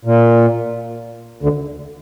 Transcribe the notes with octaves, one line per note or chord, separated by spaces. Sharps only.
A#2
D2 D3